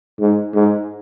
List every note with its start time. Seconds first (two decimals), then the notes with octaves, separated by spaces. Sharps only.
0.20 G#2
0.54 G#2